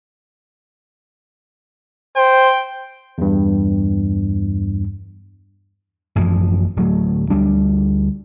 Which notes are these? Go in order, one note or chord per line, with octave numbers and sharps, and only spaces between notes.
C5 G5
E2 G2
A1 F#2 E3 F3
D1 F#3 A3
D2 G3 D4